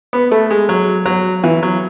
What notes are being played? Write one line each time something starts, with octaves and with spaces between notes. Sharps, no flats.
B3
A3
G#3
F#3
F#3
E3
F#3